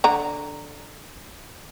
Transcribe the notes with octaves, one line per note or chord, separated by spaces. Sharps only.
D3 A#5